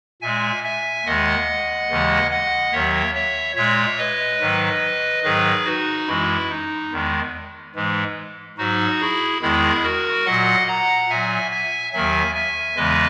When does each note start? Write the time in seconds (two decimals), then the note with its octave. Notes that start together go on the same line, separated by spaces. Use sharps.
0.21 A#2 G#3 E5 G#5
0.64 E5 G#5
1.05 D#2 D#3 G#3 D#5 F#5
1.90 D#2 C#3 E3 G#3
2.31 D#5 F#5
2.72 D#2 D#3 F#3 C#5 E5
3.14 C#5 E5
3.56 A#2 G#3 C#5 E5
3.98 B4 D#5
4.40 G#2 D#3 F#3
5.24 G#2 D#3 F#3 G#4 B4
5.65 D#4 F#4
6.07 F#2 E3 G#3 E4
6.50 D#4
6.92 E2 D#3 G#3
7.75 G#2 E3 G#3
8.58 G#2 F#3 D#4 F#4
9.00 E4 G#4
9.42 E2 D#3 G#3 E4 G#4
9.83 F#4 A#4
10.25 A#2 F#3 D#5 F#5
10.67 F#5 A#5
11.09 A#2 F#3 E5 G#5
11.51 E5 G#5
11.93 D#2 D#3 F#3 E5 G#5
12.34 E5 G#5
12.76 E2 C#3 E3 G#3 B4 D#5